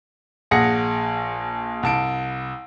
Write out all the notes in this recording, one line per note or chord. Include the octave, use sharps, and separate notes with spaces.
A#1 G#4 F#5 A#6 C#7
C2 A5 D7